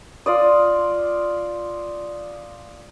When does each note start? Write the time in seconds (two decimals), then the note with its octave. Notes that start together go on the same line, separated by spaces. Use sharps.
0.26 F4 D5 D#6